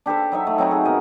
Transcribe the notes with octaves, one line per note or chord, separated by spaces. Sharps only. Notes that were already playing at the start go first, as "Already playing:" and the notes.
D4 G4 A4 C5
F#3 D#4 E5
A3
F#3 C4 D#4 F#4
G#4
B2 A#4 D#5